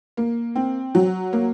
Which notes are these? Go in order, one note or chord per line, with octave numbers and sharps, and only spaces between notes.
A#3
C4
F#3
A#3